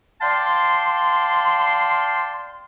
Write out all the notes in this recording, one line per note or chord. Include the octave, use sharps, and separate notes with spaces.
D5 F5 G5 A5 C6